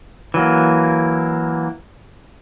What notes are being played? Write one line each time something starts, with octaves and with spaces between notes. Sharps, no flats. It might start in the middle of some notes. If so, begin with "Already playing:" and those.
E3 F#3 A#3